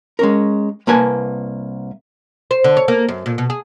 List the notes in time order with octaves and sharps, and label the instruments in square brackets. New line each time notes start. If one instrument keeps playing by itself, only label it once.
[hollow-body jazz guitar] G#3 C#4 A#4
C2 A#3 B4 G#5 A5
[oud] C5
D3
C#5
A#3
F#2
A#2
B2
G#4